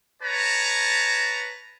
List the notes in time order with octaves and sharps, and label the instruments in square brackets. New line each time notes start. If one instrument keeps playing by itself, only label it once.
[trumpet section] B4 C#5 A5 A#5